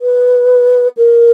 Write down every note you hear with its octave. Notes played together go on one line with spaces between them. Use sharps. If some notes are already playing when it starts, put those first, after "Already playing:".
B4
A#4